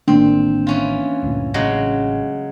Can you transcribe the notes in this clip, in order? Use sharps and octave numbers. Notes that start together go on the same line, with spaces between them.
A1 D#3 A#3 C4 D4
E3 C#4 F4
D2 G2 A#2
A1 C#3 F#3 G#3